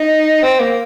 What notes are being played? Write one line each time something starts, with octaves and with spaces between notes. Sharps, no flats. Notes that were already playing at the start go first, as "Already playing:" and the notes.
Already playing: D#4
C4
A#3